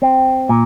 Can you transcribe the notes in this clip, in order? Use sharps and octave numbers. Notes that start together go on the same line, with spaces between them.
C4
A#2